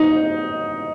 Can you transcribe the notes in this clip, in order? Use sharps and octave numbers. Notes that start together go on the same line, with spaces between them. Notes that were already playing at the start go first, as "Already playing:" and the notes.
Already playing: D#4